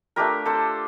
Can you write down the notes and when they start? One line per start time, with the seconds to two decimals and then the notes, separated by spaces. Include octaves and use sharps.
0.16 A3 D4 F4 G4 A#4
0.46 A4 C5